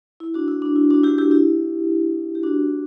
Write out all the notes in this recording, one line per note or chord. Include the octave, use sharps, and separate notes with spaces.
E4
D4 F#4
E4
D4
E4
D4 F#4
E4 G4
E4 G4
E4 G4
G4
D4 F#4